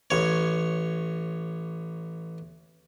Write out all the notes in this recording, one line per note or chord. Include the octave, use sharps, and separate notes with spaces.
A1 C#5